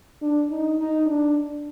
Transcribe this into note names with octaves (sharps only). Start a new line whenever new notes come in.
D4
D#4
D#4
D4